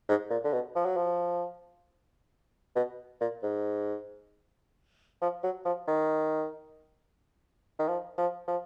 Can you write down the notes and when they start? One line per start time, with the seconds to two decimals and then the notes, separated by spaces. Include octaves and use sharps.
0.09 G#2
0.30 A#2
0.44 D3
0.53 B2
0.75 F3
0.85 F#3
0.97 F3
2.75 B2
3.21 A#2
3.43 G#2
5.21 F3
5.43 F#3
5.65 F3
5.88 D#3
7.79 D#3
7.88 F3
8.18 F3
8.48 F3